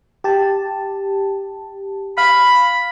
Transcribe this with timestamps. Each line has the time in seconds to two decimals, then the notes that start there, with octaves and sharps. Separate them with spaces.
0.24 G4 A5
2.18 F5 B5